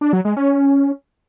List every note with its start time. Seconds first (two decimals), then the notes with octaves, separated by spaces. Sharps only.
0.01 D4
0.13 F#3
0.25 G#3
0.37 C#4